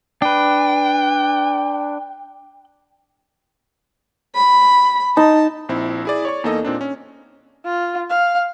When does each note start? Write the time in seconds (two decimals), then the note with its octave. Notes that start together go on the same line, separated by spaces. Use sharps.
0.22 D4 B4 G5
4.35 B5
5.17 D#4 A5
5.69 A#1 C4 E4
6.05 E4 G#4 D5
6.25 C#5 D5 C#6
6.44 E2 A#3 D#4 A4 D#5
6.63 A#2 C4 D4 D#4
6.81 C#4
7.65 F4
8.10 F5